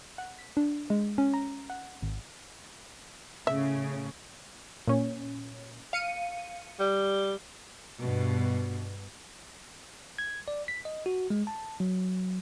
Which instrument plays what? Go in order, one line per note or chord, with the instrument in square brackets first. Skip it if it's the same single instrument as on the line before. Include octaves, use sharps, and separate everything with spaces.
[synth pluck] F#5
B6
D4
G#3
C#4
A#5
F#5
G#1
[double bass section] A2 A3 C#4 [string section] C#3 [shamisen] E5
[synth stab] A#2 C#4
F5 C#7 D#7
[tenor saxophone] G3
[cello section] G2 B2
[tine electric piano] G#6
D5
B6
D#5
F#4
G#3
A5
F#3